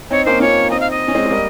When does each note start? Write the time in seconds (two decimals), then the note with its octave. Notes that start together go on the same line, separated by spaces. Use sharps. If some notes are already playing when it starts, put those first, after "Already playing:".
0.11 C4 D#4 C#5
0.26 A#3 C#4 C5
0.40 C#4 F4 C#5
0.70 C4 D#4 D#5
0.80 F5
0.91 D#5
1.08 C#4
1.15 G#3 C4
1.26 G#3
1.30 G3 A#3